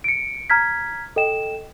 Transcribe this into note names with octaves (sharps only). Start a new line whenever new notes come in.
C#7 D7
A#5 F6 G#6 B6
A4 D#5 G5 E7